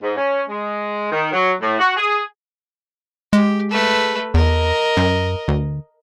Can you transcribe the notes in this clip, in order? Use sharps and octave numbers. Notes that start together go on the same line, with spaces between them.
G#2
C#4
G#3
D#3
F#3
A2
F#4
G#4
G#3 G4
A3 B4
E2 A#4 D#5
F#2
D2